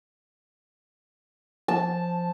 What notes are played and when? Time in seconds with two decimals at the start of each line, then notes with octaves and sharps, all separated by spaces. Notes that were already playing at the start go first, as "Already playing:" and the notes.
1.68 F3 A5